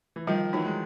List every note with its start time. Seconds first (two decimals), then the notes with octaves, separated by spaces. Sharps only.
0.16 E3
0.27 D#3 F3 G3
0.53 E3 F#3 D#4
0.65 G#3